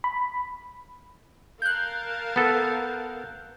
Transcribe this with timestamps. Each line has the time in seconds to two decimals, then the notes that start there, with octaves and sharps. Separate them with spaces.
0.04 B5
1.62 A#4 F5 A5 F#6 G6
2.36 B3 A4